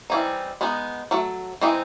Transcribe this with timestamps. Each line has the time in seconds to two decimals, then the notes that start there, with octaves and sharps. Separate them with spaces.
0.10 E3 G3 C4 D#4
0.61 G#3 B3 D#4
1.11 F#3 A3
1.61 E3 G#3 C4 D#4